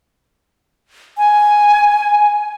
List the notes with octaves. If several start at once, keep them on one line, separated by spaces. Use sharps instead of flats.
G#5